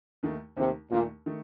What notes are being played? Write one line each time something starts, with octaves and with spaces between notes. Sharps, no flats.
D#2 D#3 A3
D#2 C3 D#3 A3
D#2 A#2 D#3 A3
D#3 A3